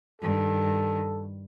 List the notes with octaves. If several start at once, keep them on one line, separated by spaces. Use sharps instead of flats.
G2 D#3 A4